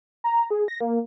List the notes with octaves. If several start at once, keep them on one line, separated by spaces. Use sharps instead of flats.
A#5
G#4
A#6
A#3